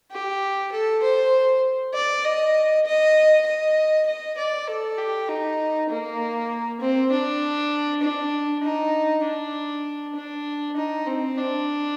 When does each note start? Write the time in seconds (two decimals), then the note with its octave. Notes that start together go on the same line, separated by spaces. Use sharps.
0.12 G4
0.72 A4
1.03 C5
1.94 D5
2.25 D#5
2.86 D#5
3.47 D#5
4.07 D#5
4.37 D5
4.68 A4
4.98 G4
5.28 D#4
5.90 A#3
6.81 C4
7.12 D4
8.02 D4
8.63 D#4
9.24 D4
10.16 D4
10.77 D#4
11.07 C4
11.37 D4